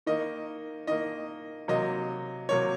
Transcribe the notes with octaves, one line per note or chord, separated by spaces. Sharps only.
D#3 A#3 D#5
D#3 A#3 D#5
C3 F#3 A#3 D#5
C3 F#3 A#3 C#5